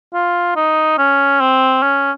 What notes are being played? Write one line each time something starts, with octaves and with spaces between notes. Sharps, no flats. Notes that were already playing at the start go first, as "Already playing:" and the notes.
F4
D#4
C#4
C4
C#4